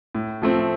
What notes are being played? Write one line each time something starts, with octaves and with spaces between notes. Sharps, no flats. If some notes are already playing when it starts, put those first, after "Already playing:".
A2
F3 A3 C4